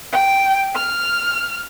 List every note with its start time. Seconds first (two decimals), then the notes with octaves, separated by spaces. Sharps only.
0.12 G5
0.75 F6